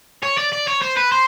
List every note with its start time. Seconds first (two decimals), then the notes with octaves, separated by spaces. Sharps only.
0.23 C#5
0.38 D5
0.53 D5
0.68 C#5
0.82 C5
0.97 B4
1.12 C5